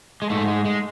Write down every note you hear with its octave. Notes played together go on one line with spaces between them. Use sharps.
G#3
G#2 A3
G#3
G#3